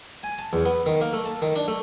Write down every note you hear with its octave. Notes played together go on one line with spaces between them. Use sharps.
G#5
A5
E2
B3
D#3
A#3
A3
A5
D#3
D4
A3